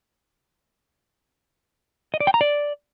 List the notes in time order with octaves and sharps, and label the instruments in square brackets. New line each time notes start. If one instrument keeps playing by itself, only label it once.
[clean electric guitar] D#5
D5
G5
A#5
D5